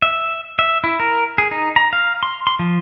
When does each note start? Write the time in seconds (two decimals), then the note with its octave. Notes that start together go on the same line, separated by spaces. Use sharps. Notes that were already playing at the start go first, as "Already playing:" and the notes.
0.02 E5
0.59 E5
0.84 E4
1.00 A#4
1.38 G#4
1.51 D#4
1.76 A#5
1.93 F5
2.23 C6
2.47 C6
2.59 F3